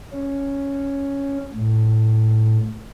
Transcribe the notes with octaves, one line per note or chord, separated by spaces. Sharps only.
C#4
A2